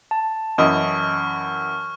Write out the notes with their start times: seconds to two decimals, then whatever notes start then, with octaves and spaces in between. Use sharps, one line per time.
0.11 A5
0.58 F#2 E3 D#5 C#6 D#6 F6